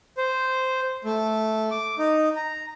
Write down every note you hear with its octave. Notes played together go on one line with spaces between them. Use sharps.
C5
A3
D6
D#4
A#5